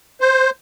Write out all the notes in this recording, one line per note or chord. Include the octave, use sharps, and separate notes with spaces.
C5